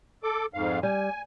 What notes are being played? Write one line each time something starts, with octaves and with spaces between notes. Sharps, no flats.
A4 D6
F2 G#2 F5
G3 G#5